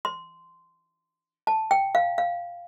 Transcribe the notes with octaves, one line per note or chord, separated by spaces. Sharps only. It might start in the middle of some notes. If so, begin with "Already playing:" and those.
C6
A5
G5
F5
F5